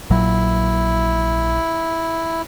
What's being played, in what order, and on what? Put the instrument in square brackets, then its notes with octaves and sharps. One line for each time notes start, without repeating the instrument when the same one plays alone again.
[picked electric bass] A#1 A#2 F#3 [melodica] E4